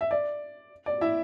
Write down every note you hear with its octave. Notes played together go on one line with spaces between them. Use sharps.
E5
D5
D5
E4 E5